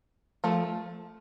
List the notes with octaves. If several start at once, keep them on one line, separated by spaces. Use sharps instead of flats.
F3 A3